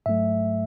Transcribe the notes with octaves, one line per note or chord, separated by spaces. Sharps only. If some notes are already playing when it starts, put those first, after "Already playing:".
G#1 G#2 F#3 A3 E5